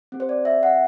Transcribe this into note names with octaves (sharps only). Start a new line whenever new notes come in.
C4 G4
C5
D5
E5
F#5